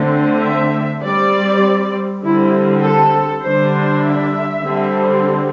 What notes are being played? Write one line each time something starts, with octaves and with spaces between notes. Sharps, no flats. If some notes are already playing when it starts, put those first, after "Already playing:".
Already playing: D3 A3 C4
E5
G3 C4 D5
D3 G3 C4 E4
A4
D3 G3 D4 C5
E5
D3 G3 C4